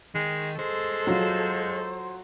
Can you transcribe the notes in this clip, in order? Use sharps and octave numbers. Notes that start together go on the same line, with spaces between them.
D#3 G#3
G#3 A4 C5
F#3 F4